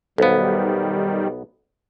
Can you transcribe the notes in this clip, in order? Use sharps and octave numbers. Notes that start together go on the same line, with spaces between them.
B1 D#3 G3 B3 A4 C5 F5